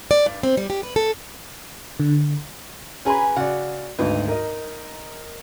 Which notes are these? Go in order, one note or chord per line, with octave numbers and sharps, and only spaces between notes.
D5
G2
C4
G3
G4
B4
A4
D3
C#4 G#4 B4 G#5 A#5 B5
C#3 F#4 D5 F#5
G#1 D2 D#4 B4
A#4 D#5